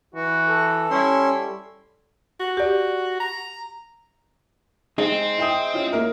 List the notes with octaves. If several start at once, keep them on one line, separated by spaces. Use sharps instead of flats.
E3 F#4
A4
G3 C#4 E4 C6
F#4
G4 D5
A#5
G#3 C4 D#4 G#4
E4 G5 D#6
C#4 E4 F4
A#3 E4 A#4